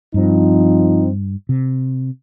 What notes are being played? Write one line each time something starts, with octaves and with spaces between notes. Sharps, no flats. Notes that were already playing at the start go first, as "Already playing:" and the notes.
G2 F3 C4 D#4
C3